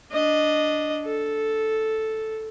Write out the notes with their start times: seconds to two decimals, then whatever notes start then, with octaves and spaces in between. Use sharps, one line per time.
0.12 D4 D#5
1.05 A4